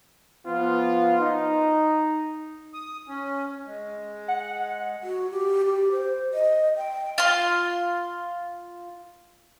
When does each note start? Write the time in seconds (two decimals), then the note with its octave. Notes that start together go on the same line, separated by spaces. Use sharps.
0.47 F3 B3 F4
1.20 D#4
2.73 D#6
3.08 C#4
3.67 G#3
4.28 F#5
5.03 F#4
5.31 G4
5.66 G4
5.92 C5
6.34 D#5
6.77 G5
7.18 F4 C6